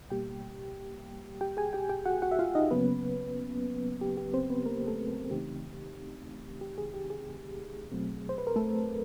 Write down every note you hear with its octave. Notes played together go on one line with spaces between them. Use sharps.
B2 G3 A#3 G4 G5
G4 G5
G#4 G#5
G4 G5
G4 G5
F#4 F#5
F#4 F#5
E5
F4 F5
D#4 D#5
C#3 F#3 A#3 B3 C#4 B4
G4
G4
C4 C5
B3 B4
A#3 A#4
A3 A4
C#3 E3 A3 C4 D#4 G4
G4
G#4
G4
G#4
B2 F#3 A3 C4
C5
B4
A#4
A3 A4